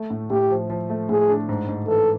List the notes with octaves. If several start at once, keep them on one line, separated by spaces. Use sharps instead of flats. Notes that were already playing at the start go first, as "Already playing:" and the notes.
Already playing: A3
A2
A2 G4
F3
F3
A3
A2 G#4
D4
G#2
G#2
E3 A4